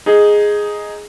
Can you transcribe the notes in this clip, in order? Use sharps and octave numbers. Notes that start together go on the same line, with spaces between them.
D#4 G#4